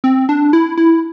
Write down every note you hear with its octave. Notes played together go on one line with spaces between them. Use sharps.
C4
D4
E4
E4